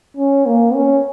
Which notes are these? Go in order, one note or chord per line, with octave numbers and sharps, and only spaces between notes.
C#4
A#3
C#4